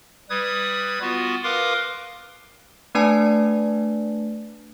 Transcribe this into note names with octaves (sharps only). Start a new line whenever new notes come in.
G3 B4 D#6 G#6
B3 F4 F#4
A#4 B4 F5 C6 D6 D#6
A3 D4 B4 D5 G#5 A5